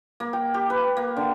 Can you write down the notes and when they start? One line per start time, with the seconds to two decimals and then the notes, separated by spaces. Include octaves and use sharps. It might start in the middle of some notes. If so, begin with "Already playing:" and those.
0.20 A#3
0.33 G5
0.54 G4
0.70 B4
0.97 A#3
1.17 D3